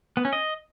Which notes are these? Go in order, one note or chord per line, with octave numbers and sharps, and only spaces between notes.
B3
C#4
D#5